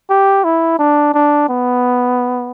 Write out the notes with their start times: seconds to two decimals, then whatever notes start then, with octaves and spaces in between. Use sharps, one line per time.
0.10 G4
0.44 E4
0.79 D4
1.14 D4
1.49 B3